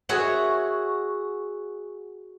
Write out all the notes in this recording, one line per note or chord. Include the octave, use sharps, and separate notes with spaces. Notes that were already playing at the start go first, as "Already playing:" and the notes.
F#4 G#4 C#5 E5